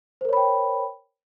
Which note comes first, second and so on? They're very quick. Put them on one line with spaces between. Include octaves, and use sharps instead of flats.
C5 A#4 C#5 B5 G5